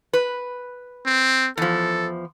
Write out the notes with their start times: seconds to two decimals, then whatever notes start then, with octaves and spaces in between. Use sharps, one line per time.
0.13 B4
1.06 C4
1.58 E2 F3 A4